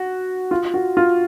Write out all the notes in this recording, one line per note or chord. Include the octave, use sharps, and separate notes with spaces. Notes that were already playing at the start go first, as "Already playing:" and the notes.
Already playing: F#4
F4
F#4
F4